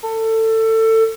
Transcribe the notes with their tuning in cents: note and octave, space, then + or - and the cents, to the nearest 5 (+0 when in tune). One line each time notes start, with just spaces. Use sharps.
A4 +25